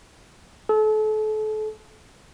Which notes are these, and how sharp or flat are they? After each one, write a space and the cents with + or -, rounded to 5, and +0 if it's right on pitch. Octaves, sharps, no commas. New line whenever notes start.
A4 -35